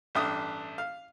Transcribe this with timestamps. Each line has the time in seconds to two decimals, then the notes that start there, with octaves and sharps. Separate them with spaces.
0.15 A1 G2 E5 D#6
0.78 F5